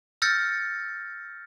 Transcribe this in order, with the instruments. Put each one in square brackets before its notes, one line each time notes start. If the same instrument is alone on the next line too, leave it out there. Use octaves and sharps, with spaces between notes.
[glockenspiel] E6 F6 G6 A6 A#6 C#7